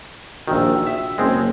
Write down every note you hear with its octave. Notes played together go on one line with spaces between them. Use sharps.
A#1 D#3 F#4 G5 E6
E5
F#1 G#3 C4